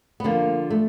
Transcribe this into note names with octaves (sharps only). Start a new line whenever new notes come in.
B3
D3 F3 A#3
A3